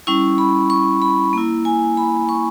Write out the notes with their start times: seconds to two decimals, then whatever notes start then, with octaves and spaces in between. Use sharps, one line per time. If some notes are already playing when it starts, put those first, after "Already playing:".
0.07 G3 C#4 E4 C#6
0.38 B5
0.70 C#6
1.02 B5
1.33 A#3 E4
1.65 G#5
1.97 B5
2.29 C#6